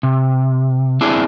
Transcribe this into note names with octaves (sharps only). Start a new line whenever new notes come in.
C3
C4 D4 E4 G#4